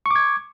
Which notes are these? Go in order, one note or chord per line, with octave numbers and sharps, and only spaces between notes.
C#6 D6 G#6